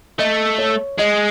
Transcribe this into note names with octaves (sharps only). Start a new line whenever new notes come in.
A3 D#5
C#5
G#3 D#5